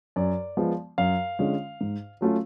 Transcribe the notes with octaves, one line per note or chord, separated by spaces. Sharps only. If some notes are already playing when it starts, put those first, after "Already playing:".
F#2 D5
F3 G#3 B3
F#2 F5
D3 G#3 C#4 F4
G#2
F#3 A3 C#4 F4